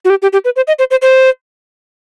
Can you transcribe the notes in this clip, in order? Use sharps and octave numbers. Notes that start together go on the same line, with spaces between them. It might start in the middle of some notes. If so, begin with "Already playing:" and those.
F#4
G4
G4
G4
B4
C5
D#5
C5
C5
C5